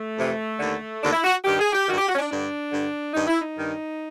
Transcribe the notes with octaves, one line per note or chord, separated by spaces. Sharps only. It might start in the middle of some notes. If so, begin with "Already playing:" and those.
Already playing: A3
F2 C3 E3
D#2 D3
D#2 D3 D4
E4
F#4
G2 D#3 G4
G#4
G4
G2 D#3 F#4
G4
F#4
C#4
D4
G2 D3 D4
G2 D3
G2 D#3 D#4
E4
D#4
G2 D#3